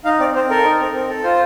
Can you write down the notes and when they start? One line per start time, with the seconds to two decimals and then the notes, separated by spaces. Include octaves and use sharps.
0.05 D#4 F5
0.20 C4 D5
0.35 C4 C5
0.49 A4 A#4
0.64 D#4
0.80 C4
0.94 C4
1.09 A4
1.23 F4 C5